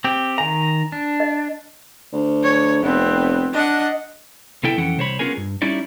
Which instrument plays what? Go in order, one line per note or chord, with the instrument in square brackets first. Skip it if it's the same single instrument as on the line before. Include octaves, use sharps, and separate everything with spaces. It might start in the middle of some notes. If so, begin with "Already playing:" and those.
[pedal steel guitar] C4 G4
[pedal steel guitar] D#3 A#5 [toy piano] G#5
[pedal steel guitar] D4
[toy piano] D#5
[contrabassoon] D2
[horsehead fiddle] C#5
[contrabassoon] F1 [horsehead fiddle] B3 C4
[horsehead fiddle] D4 [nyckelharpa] D#5 F#5
[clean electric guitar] C2 B3 E4 A4 G5
F2 E3 C#4 A4 F#5 G5
C2 C5 C#5 B5
B3 C#4 F4 G#4 A#4 G#5
G2
G3 C#4 D#4 E4 D5